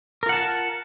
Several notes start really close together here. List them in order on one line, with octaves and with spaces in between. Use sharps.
A#4 F4 F#5 A5